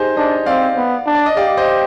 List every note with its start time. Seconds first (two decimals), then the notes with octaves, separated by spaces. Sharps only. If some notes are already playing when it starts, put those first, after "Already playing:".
Already playing: D#4 G4 G#4 C5
0.16 D4 C5 D#5
0.46 C4 D5 F5
0.77 B3
1.06 D4
1.15 D5
1.26 D#5
1.37 G4 D5 F5
1.57 C5 D#5